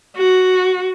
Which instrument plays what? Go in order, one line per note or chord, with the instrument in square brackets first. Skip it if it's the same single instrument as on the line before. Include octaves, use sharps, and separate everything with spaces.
[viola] F#4